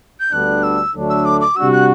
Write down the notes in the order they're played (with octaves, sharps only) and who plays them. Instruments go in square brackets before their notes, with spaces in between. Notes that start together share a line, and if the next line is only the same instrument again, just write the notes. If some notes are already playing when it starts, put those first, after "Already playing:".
[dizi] G6
[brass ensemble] D2 D3 G3 B3 D4 [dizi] F#6
[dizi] E6
[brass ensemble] D2 D3 F#3 A3 D4
[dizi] E6
D6
D6
[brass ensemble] C3 G3 D4 F#4 [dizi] E6
[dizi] F#6